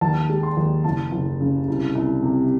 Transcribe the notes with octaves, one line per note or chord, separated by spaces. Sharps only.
D#2 A5
G#3
C6
D#2
F#1 A5
F#1
C#3
C2
C2
C3